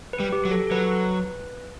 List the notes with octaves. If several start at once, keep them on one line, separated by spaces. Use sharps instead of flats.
B4
G3
G4
F#3
A4
A4
F#3 B4